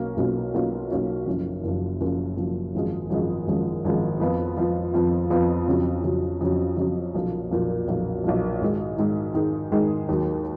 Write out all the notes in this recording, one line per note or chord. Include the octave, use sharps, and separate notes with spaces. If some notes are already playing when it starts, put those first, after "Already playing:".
Already playing: B1 B2 A#3 C#4
B1 B2 A#3 C#4 F4
B1 B2 A#3 C#4 F4
B1 B2 A#3 C#4 F4
F#1 F#2 F3
F#1 F#2 F3
F#1 F#2 F3
F#1 F#2 F3
G#1 F#2 F3 G#3
G#1 F#2 F3 G#3
G#1 F#2 F3 G#3
G#1 F#2 F3 G#3
F2 F3 B3 F4
F2 F3 B3 F4
F2 F3 B3 F4
F2 F3 B3 F4
F2 C#3 F#3 C#4
F2 C#3 F#3 C#4
F2 C#3 F#3 C#4
F2 C#3 F#3 C#4
B1 A#2 F3
B1 A#2 F3
B1 A#2 F3
B1 A#2 F3
G#2 D#3 G#3 D#4
G#2 D#3 G#3 D#4
G#2 D#3 G#3 D#4
G#2 D#3 G#3 D#4
D#2 D#3 F#3